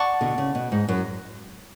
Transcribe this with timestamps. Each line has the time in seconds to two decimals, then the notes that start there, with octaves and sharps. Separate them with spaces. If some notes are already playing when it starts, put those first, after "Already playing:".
Already playing: D5 F#5 A5 C#6
0.21 B2 D3
0.38 C#3
0.55 B2
0.72 G#2
0.88 F#2